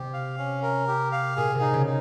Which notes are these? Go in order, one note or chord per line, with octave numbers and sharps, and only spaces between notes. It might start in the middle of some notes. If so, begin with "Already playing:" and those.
Already playing: C3 G4
F5
C#4
A#4
G4
F5
A#2 G#4
C3
D#4
C#3
D#4